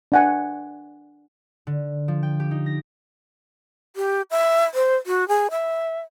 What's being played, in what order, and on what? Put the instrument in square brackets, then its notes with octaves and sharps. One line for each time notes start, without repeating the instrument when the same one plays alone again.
[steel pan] D4 F#5 G#5
[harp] D3
F3
G5
G4
D#4
A#6
[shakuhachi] G4
E5
C5
F#4
G#4
E5